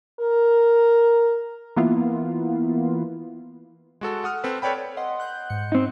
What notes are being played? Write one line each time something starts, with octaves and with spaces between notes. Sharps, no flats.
A#4
E3 A#3 B3 E4 F4
G#3 F#4 A4
F#5 D#6 F6
C4 A4 B4
A4 B4 C#5 D5 G5 B5
D#5 F#5 C6
F#5 F#6 G6
G#2 C#7
C4 D#4